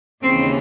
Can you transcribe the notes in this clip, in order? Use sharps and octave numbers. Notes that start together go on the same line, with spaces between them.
D#2 C#3 E3 C4